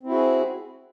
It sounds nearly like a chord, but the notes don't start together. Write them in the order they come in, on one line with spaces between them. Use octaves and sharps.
C4 E4 F#4 G#4